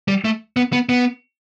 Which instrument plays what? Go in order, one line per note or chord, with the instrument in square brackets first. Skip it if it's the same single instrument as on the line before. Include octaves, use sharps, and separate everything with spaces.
[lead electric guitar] G3
A3
B3
B3
B3